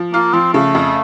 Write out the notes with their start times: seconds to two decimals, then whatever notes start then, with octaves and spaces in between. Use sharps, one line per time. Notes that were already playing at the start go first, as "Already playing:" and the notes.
Already playing: F3
0.14 A#3 F4
0.33 F3 C4
0.54 C#3 A3
0.75 F2